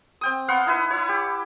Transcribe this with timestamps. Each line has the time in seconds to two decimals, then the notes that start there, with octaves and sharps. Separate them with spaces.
0.21 C4 G5 D#6
0.48 B3 F5 F#5 C6
0.66 D#4 E4 B4
0.90 E4 C#5
1.09 G4 D6